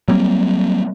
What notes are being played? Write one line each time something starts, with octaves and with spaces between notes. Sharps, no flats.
F#3 G3 A#3 C4